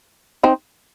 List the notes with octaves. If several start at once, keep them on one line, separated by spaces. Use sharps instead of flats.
C4 D#4